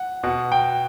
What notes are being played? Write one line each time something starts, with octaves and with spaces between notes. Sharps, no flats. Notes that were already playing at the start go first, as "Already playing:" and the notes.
Already playing: F#5
B2 F#5
G5